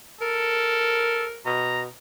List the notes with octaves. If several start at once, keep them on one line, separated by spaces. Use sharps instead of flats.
A4 A#4
B2 A#5